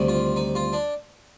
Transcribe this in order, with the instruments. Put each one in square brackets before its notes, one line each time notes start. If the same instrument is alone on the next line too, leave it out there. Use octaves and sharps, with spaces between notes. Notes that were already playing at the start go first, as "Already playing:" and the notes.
Already playing: [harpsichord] D2 C3 D#3 G3
F4
D#4
F4
D4